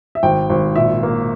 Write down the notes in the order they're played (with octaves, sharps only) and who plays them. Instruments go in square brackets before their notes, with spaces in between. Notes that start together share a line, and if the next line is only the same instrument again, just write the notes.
[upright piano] E5
G#1 G5
G#1
A#2 E5
A#3